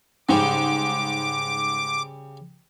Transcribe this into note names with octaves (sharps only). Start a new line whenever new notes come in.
G#2 C#3 G3 C5 D6